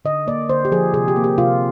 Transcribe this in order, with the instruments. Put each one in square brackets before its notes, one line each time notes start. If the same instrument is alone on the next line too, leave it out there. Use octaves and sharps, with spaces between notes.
[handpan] D3 D#5
A#3 D5
D3 C5
G4
F3 G#4
C3 G#4
G4
A#3
G4
C3 F4